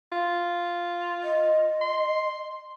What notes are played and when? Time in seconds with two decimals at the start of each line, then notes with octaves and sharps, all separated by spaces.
0.12 F4
1.24 D#5
1.82 C6